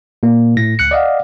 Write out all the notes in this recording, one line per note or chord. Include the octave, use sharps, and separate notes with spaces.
A#2 A#3
A2 A#6
C#2 F#6 C#7
D5 D#5 F5 F#5